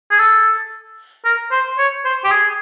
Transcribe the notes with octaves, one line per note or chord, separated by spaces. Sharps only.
G#4
A4
A#4
C5
C#5
C5
G4
G#4